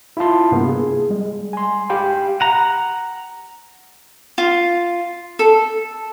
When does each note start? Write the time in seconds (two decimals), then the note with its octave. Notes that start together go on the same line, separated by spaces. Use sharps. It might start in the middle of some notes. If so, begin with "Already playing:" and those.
0.17 E4 F4 F5 A5 C6
0.51 G2 C3 A#3 B3
0.69 G#4
1.10 G3 G#3
1.53 G#5 C6
1.90 G4 F5 G5 B5
2.41 F#5 A#5
4.38 F4
5.39 A4